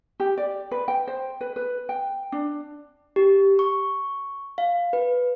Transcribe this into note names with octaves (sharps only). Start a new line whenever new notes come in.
G4
D5
B4
G5
C5
B4
B4
G5
D4
G4
C#6
F5
B4